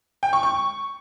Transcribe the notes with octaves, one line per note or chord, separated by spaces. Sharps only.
G5
C#6
C#6